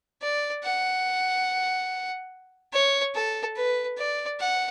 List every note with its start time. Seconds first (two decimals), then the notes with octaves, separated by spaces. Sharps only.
0.22 D5
0.63 F#5
2.72 C#5
3.14 A4
3.56 B4
3.98 D5
4.40 F#5